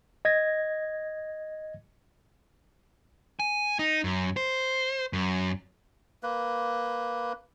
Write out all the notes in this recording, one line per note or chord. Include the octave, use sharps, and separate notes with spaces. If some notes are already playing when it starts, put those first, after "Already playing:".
D#5 G#6 A#6
G#5
D#4
F#2
C5
F#2
A#3 B4